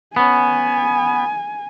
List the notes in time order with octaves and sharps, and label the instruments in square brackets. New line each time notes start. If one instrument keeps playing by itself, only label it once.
[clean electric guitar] B3 C#4 [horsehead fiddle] G#5